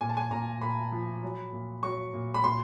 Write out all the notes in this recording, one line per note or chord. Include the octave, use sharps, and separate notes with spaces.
A#2 G#5
A5
G#5
A#2 A#5
A#2 B5
F3
F#3
A#2
F#3 C#6
A#2
B5
A#2 C6